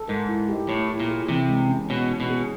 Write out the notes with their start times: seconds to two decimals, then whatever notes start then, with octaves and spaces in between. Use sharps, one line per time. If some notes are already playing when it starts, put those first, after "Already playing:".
Already playing: A4
0.08 G#2 A#4
0.29 E4
0.49 G4
0.69 A2 C#5
0.89 E4
1.00 A#2
1.09 G#4
1.29 C3 E3
1.49 G#3
1.70 C#4
1.90 B2 C#5
2.09 D#4
2.20 B2
2.30 G#4